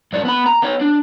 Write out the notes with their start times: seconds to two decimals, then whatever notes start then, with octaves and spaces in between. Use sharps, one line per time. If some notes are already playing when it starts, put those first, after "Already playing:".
0.13 F#2 D4
0.24 B3 B5
0.46 A#5
0.62 B3 C#5
0.81 D4